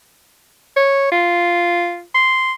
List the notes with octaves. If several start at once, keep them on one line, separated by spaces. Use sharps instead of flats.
C#5
F4
C6